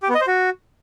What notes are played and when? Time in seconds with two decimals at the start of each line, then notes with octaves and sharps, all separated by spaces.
0.03 G4
0.09 B3
0.15 D#5
0.21 C5
0.27 F#4